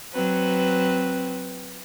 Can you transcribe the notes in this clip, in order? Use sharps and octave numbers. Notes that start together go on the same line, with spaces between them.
F#3 C4 B4